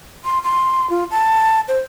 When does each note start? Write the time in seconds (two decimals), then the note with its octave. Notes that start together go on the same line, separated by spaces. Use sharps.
0.25 C6
0.44 C6
0.90 F4
1.11 A5
1.68 C5